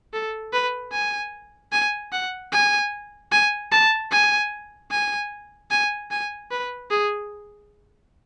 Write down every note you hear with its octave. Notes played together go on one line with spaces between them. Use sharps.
A4
B4
G#5
G#5
F#5
G#5
G#5
A5
G#5
G#5
G#5
G#5
B4
G#4